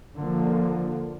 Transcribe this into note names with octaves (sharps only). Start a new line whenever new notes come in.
D3 F3 A#3